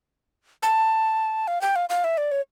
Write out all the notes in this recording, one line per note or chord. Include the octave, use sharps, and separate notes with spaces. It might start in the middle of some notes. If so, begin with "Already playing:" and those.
A5
F5
G5
F5
F5
E5
D5
C#5